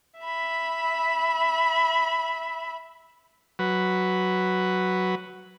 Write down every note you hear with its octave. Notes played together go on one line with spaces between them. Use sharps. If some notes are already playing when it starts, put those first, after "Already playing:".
E5 B5
F#3 B4